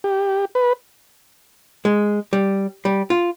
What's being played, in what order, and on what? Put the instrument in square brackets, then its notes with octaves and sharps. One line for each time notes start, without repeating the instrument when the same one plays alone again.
[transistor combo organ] G4
B4
[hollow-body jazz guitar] G#3
G3
G3
F4